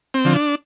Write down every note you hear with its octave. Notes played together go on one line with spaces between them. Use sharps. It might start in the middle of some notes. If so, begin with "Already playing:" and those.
C4
D3 F3
D4